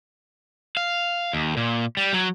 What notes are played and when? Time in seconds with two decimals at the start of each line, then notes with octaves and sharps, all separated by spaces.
0.77 F5
1.33 D#2
1.57 A#2
1.97 G3
2.13 F#3